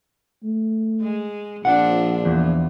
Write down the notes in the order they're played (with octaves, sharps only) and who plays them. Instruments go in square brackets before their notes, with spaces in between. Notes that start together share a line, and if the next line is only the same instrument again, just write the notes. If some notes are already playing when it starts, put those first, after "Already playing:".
[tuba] A3
[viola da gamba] G#3
[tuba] A#1 [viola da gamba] F3 C4 D4 [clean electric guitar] F#5
[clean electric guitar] E2 [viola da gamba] F3